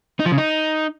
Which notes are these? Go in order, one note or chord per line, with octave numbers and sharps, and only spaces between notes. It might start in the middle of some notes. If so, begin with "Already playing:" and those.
D#4
F3
C#3
D#4